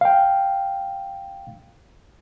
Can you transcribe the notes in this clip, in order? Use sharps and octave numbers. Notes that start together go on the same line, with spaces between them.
F5 G5